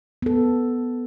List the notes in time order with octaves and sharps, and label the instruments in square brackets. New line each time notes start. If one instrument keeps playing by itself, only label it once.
[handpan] B3 A4